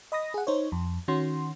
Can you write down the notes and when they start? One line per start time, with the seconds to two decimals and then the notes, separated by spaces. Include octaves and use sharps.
0.12 D#5 B5 D#6 A#6
0.34 G#4 F#5
0.47 D#4 C5 C#5
0.72 F2
1.08 D#3 C#4 F#4 C6